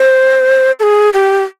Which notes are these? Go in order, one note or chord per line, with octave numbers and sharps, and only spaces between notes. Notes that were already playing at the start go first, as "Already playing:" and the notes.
Already playing: C5
A4
G#4
G4